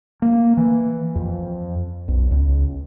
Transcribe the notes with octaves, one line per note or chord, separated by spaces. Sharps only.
A#3
E3
F2
B1
C#2